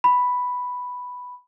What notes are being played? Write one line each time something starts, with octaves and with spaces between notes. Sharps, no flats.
B5